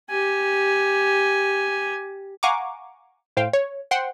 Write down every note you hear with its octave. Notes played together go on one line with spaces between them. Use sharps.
G4 G#5
F5 F#5 G#5 A#5 C#6 D6
A2 C5 F5 G5
C#5
C5 F#5 G5 C6